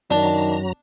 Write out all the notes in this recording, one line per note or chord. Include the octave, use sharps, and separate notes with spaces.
F#2 D#3 F#3 D4 A#5